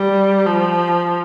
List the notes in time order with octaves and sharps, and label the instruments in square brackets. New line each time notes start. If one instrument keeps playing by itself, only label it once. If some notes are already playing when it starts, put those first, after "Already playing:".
Already playing: [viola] G3
F3